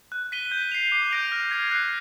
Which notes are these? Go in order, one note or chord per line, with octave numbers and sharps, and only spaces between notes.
F#6
B6 D#7 G7
G6
C7 F7
D6
G6 A#6 D7 F7
F6
G#6 C7
F#6